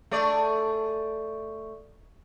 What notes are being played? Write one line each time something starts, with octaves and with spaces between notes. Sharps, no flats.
A3 G#4 D5